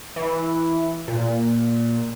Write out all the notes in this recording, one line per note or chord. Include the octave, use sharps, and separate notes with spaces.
E3
A#2